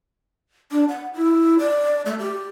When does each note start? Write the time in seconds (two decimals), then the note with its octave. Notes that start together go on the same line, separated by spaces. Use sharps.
0.72 D4
0.89 F#5
1.14 E4
1.59 D5
2.06 A3
2.19 G4